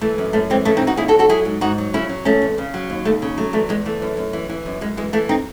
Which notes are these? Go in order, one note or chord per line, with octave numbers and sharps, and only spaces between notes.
E3 A3
F#2
F#2 A3
E3 G#3 C4
C#3 A3 C#4
C4 D#4
E3
D#4 F#4
D#2 E4 G#4
F#4 A4
D#2
F#4 A4
F#3 E4 G#4
G#2
G#2 D#4 F#4
F#3
C#3 C#4 E4
F#3
E2 A3 C#4
E2
C#3
F#3
D#2
D#2 A3
C#3
F#3 A3
E2 A3
E2 G#3
E3 A3
F#2
F#2
E3
E3
F#2
F#2 G#3
E3 G#3
E3 A3
C4 D#4